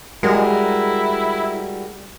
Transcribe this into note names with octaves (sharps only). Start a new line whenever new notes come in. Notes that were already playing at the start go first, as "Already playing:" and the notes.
G3 G#3 E4 F#4 A#4